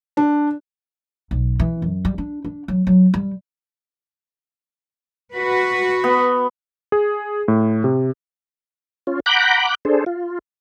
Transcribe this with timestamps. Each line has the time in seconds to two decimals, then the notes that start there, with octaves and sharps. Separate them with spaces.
0.17 D4
1.31 B1
1.60 E3
1.82 F#2
2.05 G3
2.18 D4
2.45 D4
2.68 F#3
2.87 F#3
3.14 G3
5.34 F#4 B4
6.04 B3
6.92 G#4
7.48 A2
7.84 C3
9.07 C#4 F4
9.26 F#5 A#5 B5 D6 F#6 G6
9.85 D4 G#4 A4 C5
10.06 F4